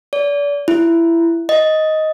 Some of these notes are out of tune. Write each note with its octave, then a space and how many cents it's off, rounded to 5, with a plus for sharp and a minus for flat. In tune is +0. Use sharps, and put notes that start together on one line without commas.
D5 -35
E4 +20
D#5 +10